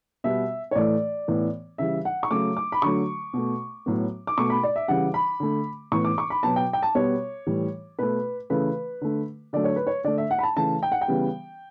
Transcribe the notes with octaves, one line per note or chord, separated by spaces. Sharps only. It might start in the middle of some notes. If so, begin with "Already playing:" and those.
B2 G3 B3 E5
C#5
A2 E3 A3 D5
A2 E3 B3
C#3 E3 G3 E5
F#5
C#6
C#3 F#3 A3 D6
D6
B5
D3 F#3 A3 C#6
B2 A3
A2 F#3 B3
D6
B2 A3 C#6
B5
D5
E5
C#3 E3 G3 F#5
B5
D3 A3
A2 E3 B3 C#6
D6
C#6
B5
B2 F#3 B3 A5
G5
G5
A5
B2 G3 B3 C#5
A2 E3 G3
B2 A3 B4
C#3 E3 A3 B4
D3 A3
D3 F#3 A3 D5
C#5
B4
C#5
D3 A3 D5
E5
F#5
B5
A5
C#3 E3 A3 A5
G5
F#5
G5
C#3 E3 G3 B3